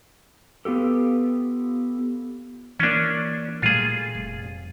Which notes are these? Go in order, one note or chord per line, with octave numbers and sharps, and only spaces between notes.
B3 F4 G4 A4
E3 A#3 C#4 D4
A#2 G3 A3 F4 G#4
F1